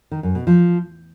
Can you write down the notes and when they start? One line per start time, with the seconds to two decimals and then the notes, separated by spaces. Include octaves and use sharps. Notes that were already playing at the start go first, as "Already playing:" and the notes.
0.11 D#3
0.23 F#2
0.35 B2
0.47 F3